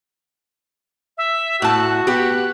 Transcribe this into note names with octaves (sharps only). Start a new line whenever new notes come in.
E5
A2 F#4 A5 F#6
B3 G4 F#6